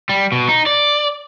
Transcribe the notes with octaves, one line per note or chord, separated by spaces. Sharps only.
G3
B2
D#4
D5